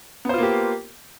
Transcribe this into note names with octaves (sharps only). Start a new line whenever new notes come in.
A#3 B3 F4 G4 C5